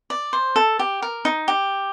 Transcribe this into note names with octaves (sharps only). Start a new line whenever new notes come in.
D5
C5
A4
G4
A#4
D#4
G4